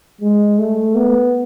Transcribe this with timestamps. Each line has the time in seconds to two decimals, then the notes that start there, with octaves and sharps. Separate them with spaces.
0.21 G#3
0.59 A3
0.95 B3